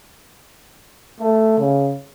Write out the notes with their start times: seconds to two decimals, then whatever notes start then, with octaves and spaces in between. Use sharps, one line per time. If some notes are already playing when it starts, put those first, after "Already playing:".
1.20 A3
1.58 C#3